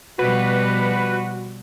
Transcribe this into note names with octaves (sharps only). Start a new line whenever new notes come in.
B2 F3 G3 F#4 B4